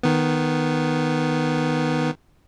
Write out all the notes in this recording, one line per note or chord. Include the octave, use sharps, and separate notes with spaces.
D#3 B3